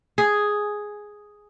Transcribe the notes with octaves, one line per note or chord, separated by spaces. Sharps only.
G#4